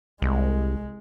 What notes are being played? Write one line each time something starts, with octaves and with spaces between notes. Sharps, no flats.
C2 G#3